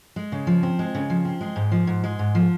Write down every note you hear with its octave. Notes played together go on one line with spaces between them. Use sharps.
G#3
C#3
F3
C4
G#3
C#3
F3
C4
G#3
G#2
F3
G#2
G#3
G#2
F3